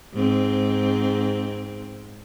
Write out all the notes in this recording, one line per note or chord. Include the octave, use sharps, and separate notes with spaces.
G#2 C4